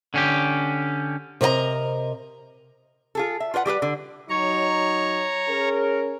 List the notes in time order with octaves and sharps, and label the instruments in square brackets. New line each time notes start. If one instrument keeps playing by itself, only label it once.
[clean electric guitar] D3 C#4 G4
[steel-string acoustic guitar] C3 A#4 D5 D#5 A#5
[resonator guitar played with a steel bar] F4 G#4 A4
E5
F4 B4 C5 F#5
G3 G4 G#4 B4
D3
[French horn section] F#3 D#4 [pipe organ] C#5 A#5 C#6
[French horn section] C#4 G#4 A#4